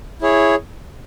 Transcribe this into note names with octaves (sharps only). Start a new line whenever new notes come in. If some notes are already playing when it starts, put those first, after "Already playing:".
E4 G#4 C#5